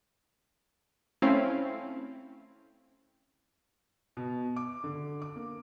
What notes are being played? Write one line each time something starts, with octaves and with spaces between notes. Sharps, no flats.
A3 C4 C#4 E4 F5
B2
D6
D3
D6
A#3